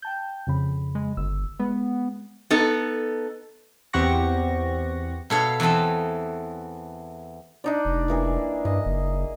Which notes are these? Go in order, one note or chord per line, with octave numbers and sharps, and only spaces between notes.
G5 A5 G6
F2 C#3 B5
G#3
G1 E6
G#3 B3
B3 D#4 A4
E2 C4 G4 F#5 C#6 A#6
B2 A4 C#5 F5
E2 E3 C4 A4 A5
D4 D#4 D5
F1
E3 A#3 G#4
G2 D#5
F#1